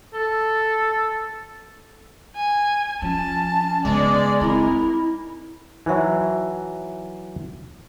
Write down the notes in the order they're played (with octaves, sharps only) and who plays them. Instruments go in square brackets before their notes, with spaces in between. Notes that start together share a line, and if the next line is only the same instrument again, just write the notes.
[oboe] A4
[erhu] G#5
[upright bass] F3 [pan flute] C#4 [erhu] A5
[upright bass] C#3 B3 [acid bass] G#3 [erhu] D5
[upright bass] C4 D#4 [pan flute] E4 [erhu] A#4
[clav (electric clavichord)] E3 F#3 [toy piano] D#4 C5 E5